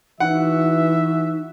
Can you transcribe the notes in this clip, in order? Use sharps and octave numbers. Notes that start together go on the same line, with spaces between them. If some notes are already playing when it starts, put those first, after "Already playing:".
E3 D#4 F#4 E5 F#5